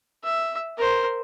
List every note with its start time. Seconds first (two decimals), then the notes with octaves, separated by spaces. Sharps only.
0.23 E5
0.77 A#4 C5